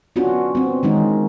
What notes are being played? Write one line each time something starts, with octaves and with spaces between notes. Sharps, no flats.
B3 C#4 D4 F4 F#4
B3 C4
D#3 E3 G#3 C#4 D#4